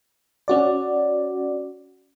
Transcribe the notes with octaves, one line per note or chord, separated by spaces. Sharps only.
C#4 F#4 D5